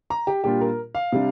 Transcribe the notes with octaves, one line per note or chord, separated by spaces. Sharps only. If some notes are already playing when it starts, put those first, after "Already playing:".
A#5
G4
A#2 G3 D4 F4 G4
A#4
F5
C3 G3 D4